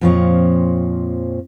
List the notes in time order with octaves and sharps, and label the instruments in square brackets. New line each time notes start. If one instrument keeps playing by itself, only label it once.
[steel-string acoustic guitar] F2 A#2 F3 C4 C#5 D#5